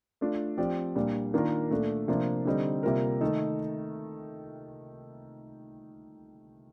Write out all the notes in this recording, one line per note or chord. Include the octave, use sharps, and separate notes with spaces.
A3 D4 F4
F3 C4 G4 D5
A#2 G3 D4
D#3 A#3 D4 F4 A#4
A#2 A3 D4 A4
C3 F3 A#3 D4 F4
D3 G3 C4 D#4
C3 G3 A#3 F4 A#4
D#3 A3 D#4 A4